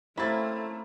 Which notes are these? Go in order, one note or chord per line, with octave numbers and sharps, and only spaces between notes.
A3 A#3 C4 C#4 E4 B5 A6